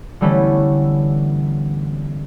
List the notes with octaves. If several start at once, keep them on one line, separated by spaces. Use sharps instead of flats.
D3 E3 G3 A3 B3 C#4